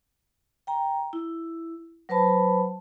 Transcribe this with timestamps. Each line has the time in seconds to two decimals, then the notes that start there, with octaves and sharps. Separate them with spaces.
0.67 G5 A#5
1.13 E4
2.09 F#3 B4 C5 A5 B5